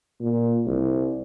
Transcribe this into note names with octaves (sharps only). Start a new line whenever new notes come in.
A#2
C2